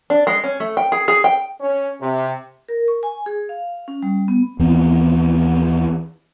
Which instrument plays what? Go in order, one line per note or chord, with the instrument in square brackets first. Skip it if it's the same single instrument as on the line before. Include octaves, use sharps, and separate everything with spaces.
[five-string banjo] D4
G#3
C#4
A3
G5
G#4
G#4
G5
[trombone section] C#4
C3
[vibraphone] A#4
C#6
G#5
G#4
F5
C#4
G3
B3
[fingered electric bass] D#2 E3 B3 C4